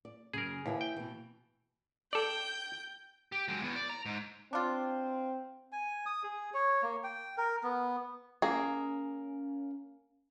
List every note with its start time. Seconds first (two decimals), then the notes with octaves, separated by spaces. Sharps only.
0.05 D5
0.33 F#2 C#3 G#4 A#4
0.66 D#2 E3 E4 G#4
0.81 G5
0.97 B2 E3
2.13 A4 D5 G5 G6
3.32 G4
3.48 F#3 G#3
3.62 E2 B3
3.76 D5
3.90 A#5
4.06 G#2
4.53 C4 D4 F4
5.72 G#5
6.06 D#6
6.23 G#4
6.54 C#5
6.83 A#3
7.04 G5
7.38 A#4
7.63 B3
8.42 A#3 C#4 G#4